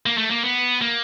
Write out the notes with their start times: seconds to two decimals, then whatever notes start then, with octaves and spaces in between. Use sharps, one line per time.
0.06 A#3
0.18 A3
0.31 A#3
0.43 B3
0.81 A#3